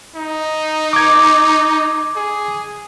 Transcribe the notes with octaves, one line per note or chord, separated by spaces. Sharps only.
D#4
D6 G#6
G#4